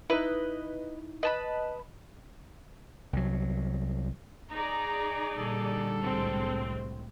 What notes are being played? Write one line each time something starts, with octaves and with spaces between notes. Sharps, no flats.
D#4 E4 B4 D#5
B4 D#5 A5 B5
C2 F#3
D#4 G#4 D5 A#5
A#2 D3 G3 A4
C2 A2 G#3 C4